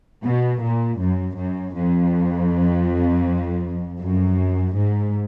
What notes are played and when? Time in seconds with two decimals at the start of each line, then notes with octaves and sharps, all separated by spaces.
0.24 B2
0.62 A#2
1.00 F#2
1.37 F#2
1.76 F2
4.01 F#2
4.77 G#2